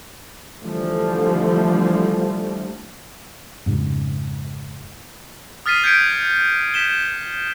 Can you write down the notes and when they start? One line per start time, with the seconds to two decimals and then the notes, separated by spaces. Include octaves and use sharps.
0.61 D3 E3 F3 G3 A3
3.66 F2 G#2 C#3
5.66 D#6 F6 A6 B6 C7 D#7
5.84 G6 G#6 B6 C#7 D7
6.74 B6 E7 G7